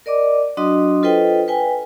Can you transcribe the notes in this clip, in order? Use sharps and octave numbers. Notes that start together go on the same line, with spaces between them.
A#4 D5 D#5 D6
F#3 D4 F#4 D#5 C6 D#6
F4 A4 B4 C5 D#5 G5
B4 G5 G#5